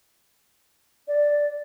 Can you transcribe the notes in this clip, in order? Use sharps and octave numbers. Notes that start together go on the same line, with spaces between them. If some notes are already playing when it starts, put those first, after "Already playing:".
D5